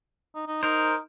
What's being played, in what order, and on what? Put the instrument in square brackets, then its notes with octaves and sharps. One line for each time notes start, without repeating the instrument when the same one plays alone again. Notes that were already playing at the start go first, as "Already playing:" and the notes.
[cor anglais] D#4
D#4
[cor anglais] D#4 [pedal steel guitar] A#4 C5